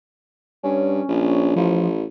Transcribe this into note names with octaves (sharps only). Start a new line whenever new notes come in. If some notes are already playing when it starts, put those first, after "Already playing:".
G2 C#4
A#1
A1 F3